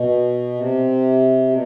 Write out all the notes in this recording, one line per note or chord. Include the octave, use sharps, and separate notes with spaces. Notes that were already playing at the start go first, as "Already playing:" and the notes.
Already playing: B2
C3
B2